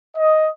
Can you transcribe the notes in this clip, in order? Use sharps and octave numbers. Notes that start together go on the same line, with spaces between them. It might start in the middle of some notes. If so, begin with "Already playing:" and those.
D#5